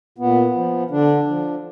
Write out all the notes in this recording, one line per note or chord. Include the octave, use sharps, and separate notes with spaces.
A#2 B3
F3
D3 D4
F3